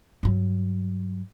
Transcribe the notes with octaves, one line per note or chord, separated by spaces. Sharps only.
G2 F#3